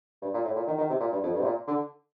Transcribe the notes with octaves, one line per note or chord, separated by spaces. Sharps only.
G2
A#2
A2
A#2
D#3
D#3
C3
A#2
G2
F2
G2
C3
A#2
D3